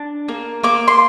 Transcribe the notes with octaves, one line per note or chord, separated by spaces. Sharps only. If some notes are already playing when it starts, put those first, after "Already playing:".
Already playing: D4
A#3
A#3 D6
C6